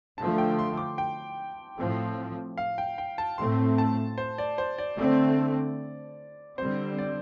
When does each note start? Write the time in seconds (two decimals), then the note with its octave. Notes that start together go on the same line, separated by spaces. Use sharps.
0.18 D3 F3 A3 A5
0.38 G5
0.59 C6
0.77 D6
0.98 G5
1.78 A2 F3 C4
2.58 F5
2.78 G5
2.98 G5
3.18 A5
3.38 A2 A3 C4 C6
3.78 A5
4.18 C5
4.38 D5
4.58 C5
4.78 D5
4.98 D3 A3 C4 D5
6.58 D3 G3 C4 C5
6.98 D5